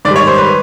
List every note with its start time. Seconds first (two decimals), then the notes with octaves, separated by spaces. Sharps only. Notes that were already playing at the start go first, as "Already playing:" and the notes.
0.05 G#2 D#3 G3 D5
0.16 C#5
0.27 C5
0.38 B4